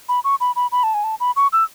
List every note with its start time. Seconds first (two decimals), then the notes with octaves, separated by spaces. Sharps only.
0.09 B5
0.24 C#6
0.40 B5
0.56 B5
0.72 B5
0.83 A5
0.94 G#5
1.04 A5
1.20 B5
1.36 C#6
1.53 E6